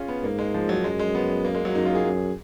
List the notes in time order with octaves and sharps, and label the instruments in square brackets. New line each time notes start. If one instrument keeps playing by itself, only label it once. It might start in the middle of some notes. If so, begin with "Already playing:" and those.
Already playing: [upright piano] C#4 F4 G#4
B3
[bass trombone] G#2 [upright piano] A#3
[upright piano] G#3
F3
F#3
[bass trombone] F#2 [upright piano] G#3
[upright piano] G#3
B3
A#3
G#3
F#3
[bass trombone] F#2 [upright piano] D#4
[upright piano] F4
G#4
[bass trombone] F#2